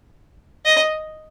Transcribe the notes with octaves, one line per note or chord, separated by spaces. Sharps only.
D#5